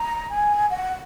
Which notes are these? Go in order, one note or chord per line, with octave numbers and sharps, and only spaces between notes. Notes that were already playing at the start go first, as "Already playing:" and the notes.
Already playing: A#5
G#5
F#5